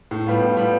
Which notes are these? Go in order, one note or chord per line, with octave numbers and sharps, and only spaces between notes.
A2
G3 B3 F4
A2
G3 B3 F4